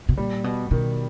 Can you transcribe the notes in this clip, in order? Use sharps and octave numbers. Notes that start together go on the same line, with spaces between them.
B2
A#2 G3
B2
B2 D#3